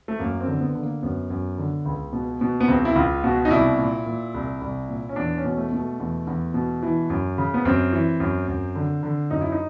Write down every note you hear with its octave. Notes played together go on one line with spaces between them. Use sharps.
A3
F#2 A#3
C4
D3
B3
D3
A#3
F#2 B3
F#2
D3
C#2
B2
B2
B3
C#2 C4
E4
C#2 F4
B2 F#4
D#4
C2 E4
A#2
A#2
C2
C2
A#2
C#4
E2 D4
C#4
B2
A3
B2
A3
E2
E2
B2
E3
F#2
C#3
B3
F#2 C4
E3
F#2
F#2
D3
D3
F#2 D#4
E4
D#4